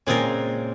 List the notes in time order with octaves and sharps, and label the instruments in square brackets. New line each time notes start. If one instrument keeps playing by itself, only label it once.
[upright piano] A#2 [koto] C#3 G#3 C4 F4 A#4